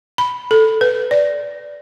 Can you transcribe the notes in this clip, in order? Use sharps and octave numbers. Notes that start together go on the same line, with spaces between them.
B5
A4
B4
D5